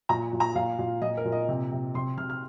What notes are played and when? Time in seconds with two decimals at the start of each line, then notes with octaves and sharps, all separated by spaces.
0.09 A#2 A#5
0.33 A#2
0.40 A#5
0.55 A#2 F5
0.79 A#2
1.02 A#2 D#5
1.17 A#4
1.25 A#2
1.32 D#5
1.49 C3
1.72 C3
1.95 C3 C6
2.18 C3 F6
2.30 F6